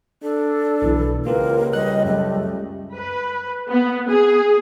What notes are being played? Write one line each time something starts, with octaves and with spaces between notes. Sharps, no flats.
D4 A4
B1 B2 E3 E4
C#2 A#3 F4 G4 A#4 B4
G3 D#5 F#6
F#2 A3
B4
B3
G#4